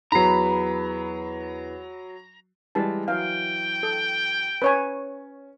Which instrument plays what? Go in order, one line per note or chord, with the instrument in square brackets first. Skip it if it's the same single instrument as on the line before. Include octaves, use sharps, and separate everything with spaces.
[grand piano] E2 B3 C7 [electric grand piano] F#3 B5 [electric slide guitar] A#5
[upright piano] E3 G3 G#3 [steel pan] A5
[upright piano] E3 F#3 [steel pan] F5 [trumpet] G5
[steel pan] A4
[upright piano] C#4 [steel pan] B4 C#5 G#5